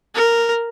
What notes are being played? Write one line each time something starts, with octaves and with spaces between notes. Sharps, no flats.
A#4